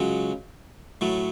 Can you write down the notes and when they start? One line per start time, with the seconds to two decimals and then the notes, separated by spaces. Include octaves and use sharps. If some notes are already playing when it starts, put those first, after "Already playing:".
Already playing: C#2 C#3 F#3
1.01 A2 F#3 A3